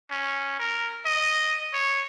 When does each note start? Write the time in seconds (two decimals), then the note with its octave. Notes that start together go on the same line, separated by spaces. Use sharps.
0.11 C#4
0.60 A#4
1.06 D#5
1.74 C#5